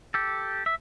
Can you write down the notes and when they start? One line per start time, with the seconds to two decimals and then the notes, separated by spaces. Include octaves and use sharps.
0.14 G4 A4
0.66 E5